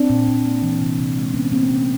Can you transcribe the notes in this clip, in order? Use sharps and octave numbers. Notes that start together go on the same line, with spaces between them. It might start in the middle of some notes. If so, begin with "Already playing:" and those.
Already playing: C4 D4
A#2
A#2
A#3
E3
C3
C3
G#3
E3 B3 C#4
C3 A#3 C4
C3 B3 C#4